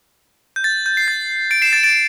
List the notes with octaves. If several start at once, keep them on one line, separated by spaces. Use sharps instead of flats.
G6
A6
G6
C7
A6
A6 D7
C7 E7
A6 D7
A6 D7